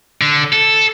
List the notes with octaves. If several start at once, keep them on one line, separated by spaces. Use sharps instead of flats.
D3
A4